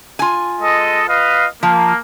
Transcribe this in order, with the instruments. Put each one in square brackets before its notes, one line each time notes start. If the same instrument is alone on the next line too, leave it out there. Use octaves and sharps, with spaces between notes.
[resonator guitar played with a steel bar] F4 G#5
[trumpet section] G#3 A4 D#5
B4 D#5 F5
[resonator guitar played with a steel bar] F3 [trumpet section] A#3